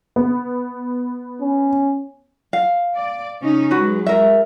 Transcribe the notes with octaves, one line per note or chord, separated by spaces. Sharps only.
B3
C#4
F5
D5
C#3 C#4 D#4
F#3 G#3 F#4 B4
A#4 E5